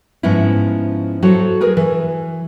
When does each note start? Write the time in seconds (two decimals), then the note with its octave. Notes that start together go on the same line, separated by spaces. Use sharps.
0.23 G#2 F3 B3 C#4 E4
1.22 F#3 F#4 A4 C5 C#5
1.61 G#4 A#4 B4
1.77 E3